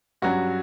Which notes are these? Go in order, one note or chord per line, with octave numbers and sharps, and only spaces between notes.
G2 F#3 C#4 F#4